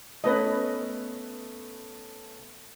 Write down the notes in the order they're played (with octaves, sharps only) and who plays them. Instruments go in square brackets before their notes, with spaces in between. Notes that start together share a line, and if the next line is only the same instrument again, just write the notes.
[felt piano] A3 B3 C#4 [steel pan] B4 D#5